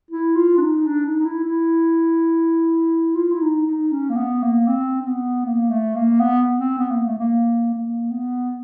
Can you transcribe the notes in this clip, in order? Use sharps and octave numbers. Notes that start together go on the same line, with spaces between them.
E4
F4
D4
D#4
D4
D#4
D#4
E4
E4
F4
E4
D#4
D#4
C#4
A#3
B3
A#3
C4
C4
B3
A#3
A3
A#3
B3
C4
B3
A#3
A3
A#3
A#3
B3